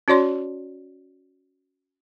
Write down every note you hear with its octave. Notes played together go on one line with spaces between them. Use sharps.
C#4 F#4 C#5 D5 C6